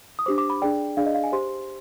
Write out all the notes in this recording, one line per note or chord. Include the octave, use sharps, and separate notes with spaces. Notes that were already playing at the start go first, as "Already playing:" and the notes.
D#6
D4 G4 C5 D6
D6
B5
D4 G#4 D5 G5
D4 G#4 D5 F5
D#5
F5
G#5
G4 C5 C6